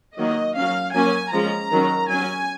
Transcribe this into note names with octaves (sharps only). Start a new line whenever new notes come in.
D#3 F#3 A#3 D#5
F#3 C#4 F5
F#3 A#3 C#4 G#5
F3 G#3 C#4 A#5
D#3 F#3 C#4
F#3 C#4 G#5